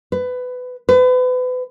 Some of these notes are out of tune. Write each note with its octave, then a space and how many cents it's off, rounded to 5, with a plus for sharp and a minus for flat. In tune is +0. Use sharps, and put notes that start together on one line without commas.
B4 +20
B4 +35